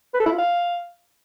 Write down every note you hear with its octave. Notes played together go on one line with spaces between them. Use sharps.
B4
A4
E4
F4
F5